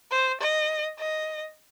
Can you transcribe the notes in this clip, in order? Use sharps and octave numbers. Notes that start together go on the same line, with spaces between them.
C5
D#5
D#5